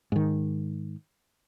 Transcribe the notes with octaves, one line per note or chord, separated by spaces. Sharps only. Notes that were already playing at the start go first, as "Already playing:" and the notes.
G#2 D#3